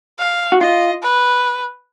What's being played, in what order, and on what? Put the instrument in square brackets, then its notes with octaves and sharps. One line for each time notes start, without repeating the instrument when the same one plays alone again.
[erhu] F5
[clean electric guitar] F#4
[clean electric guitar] F4 [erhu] D#5
[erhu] B4